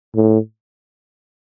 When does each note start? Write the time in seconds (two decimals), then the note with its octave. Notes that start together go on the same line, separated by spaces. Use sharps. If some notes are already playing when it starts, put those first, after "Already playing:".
0.16 A2